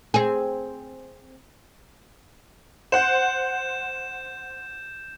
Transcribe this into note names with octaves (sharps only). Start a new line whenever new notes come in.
C4 G#4
C5 F#5 G6 E7